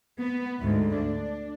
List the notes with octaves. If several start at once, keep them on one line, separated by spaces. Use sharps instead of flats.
B3
D2 G#2
D4